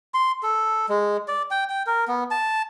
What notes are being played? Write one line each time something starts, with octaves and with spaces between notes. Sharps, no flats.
C6
A4
G#3
D5
G5
G5
A#4
B3
A5